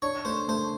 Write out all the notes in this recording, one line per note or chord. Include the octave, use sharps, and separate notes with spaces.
D4 C#5
A3 C5
A3 C5